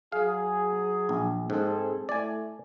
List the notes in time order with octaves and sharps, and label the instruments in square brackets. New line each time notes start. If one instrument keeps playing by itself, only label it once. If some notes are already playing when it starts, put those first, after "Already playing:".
[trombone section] F#3 G#4 [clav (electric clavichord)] F5
[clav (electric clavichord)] A#1
[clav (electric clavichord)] G#2 [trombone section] C4 G#4 A4
[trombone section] A2 A3 [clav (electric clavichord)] D5 G#5